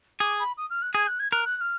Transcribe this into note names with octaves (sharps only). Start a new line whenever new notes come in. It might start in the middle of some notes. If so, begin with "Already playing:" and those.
G#4 D6
B5
D#6
F6
F#6
G#4 G#6
F#6
G#6
A#4 F#6
F#6
F#6
F6